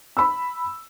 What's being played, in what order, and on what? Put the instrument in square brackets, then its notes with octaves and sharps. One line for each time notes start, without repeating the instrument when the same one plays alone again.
[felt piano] B5 E6